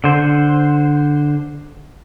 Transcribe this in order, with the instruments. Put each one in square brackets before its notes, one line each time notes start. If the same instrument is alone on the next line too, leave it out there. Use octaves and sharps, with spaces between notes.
[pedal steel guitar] D3 C5